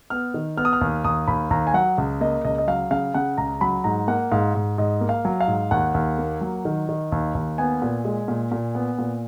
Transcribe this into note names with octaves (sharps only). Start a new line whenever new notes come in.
B3 F6
D#3
B3 F6
D#6
F6
D#2
D#2 D#6
D#2 B5
D#2 A#5
G#5
F#3 F#5
C#2
A#3 D#5
C#2 D#5
D#5
F#3 F5
C#3 F5
C#3 F#5
C#2 A#5
F#3 B5
G#2 A#5
A#3 F#5
G#2 F5
G#2
G#2 D#5
A#3
F5
F#3
F5
G#2
D#2 F#5
D#2
A#3
F#3
D#3
D#3
D#2
D#2
B3 G#5
A#2
G#3
A#2
A#2
B3
A#2